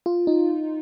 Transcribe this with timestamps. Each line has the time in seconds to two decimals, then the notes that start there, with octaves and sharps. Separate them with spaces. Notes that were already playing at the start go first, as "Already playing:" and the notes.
0.06 F4
0.27 D#4